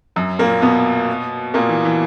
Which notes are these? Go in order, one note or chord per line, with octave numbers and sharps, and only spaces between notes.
F#2 F#3
A#2 A#3
B2 B3
A#2 A#3
E3
E3